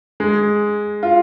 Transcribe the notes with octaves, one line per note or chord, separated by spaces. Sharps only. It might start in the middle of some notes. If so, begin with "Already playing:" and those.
G#3
F4